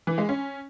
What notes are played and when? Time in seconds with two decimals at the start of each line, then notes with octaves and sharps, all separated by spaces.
0.07 E3
0.18 G#3
0.29 C#4